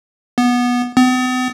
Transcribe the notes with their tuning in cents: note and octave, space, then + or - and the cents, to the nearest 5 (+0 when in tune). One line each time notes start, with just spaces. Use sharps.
B3 -15
B3 +45